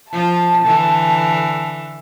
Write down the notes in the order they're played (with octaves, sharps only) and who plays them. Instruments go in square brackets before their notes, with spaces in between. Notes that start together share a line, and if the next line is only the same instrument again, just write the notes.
[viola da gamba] F3 F4 [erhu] A5
[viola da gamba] D3 E3